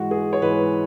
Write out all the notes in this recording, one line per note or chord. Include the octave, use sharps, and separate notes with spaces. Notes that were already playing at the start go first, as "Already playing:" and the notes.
Already playing: G#2 E3 G#3 F#4
G#4
C#5
G#2 E3 G#3 B4